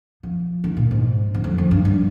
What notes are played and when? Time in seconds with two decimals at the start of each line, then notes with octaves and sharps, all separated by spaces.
0.23 F3
0.64 E3
0.77 A#2
0.91 G#2
1.34 E2
1.44 F2
1.58 F2
1.71 G2
1.85 G2